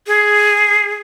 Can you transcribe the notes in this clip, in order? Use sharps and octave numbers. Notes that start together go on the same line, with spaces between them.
G#4